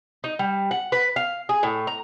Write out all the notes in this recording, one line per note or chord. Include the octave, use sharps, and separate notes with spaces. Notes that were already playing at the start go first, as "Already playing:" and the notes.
D#4
G3
F#5
B4
F5
G#4
A2
A#5